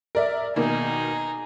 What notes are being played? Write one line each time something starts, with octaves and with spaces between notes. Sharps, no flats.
A#4 D5 E5
B2 D#3 A#3 D#4 G#4